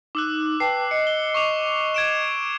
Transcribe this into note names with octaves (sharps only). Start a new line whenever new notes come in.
D#4 D6 E6 F#6
B4 G5 A5 C7
D#5 C#7
G7
C#6 D6 F7
G#6 D7 E7